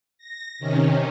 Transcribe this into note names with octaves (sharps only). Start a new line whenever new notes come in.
A#6
C3 D#3 C#4